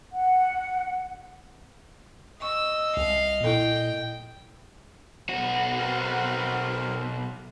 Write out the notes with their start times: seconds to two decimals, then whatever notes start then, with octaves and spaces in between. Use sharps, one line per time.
0.12 F#5
2.42 D#5 C#6 E6
2.97 C2 F5
3.44 A#2 A#3 E4 A4 G5
5.29 B1 F#4
5.78 C4 A#4